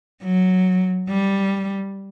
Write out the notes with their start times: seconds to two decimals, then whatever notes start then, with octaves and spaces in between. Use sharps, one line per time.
0.23 F#3
1.09 G3